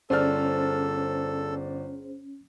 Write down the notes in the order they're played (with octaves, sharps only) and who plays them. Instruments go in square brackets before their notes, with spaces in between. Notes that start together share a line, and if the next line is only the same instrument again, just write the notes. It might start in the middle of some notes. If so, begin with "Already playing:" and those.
[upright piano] G1 D5 F6 [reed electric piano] C#4 [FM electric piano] G#4 C5 [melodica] A4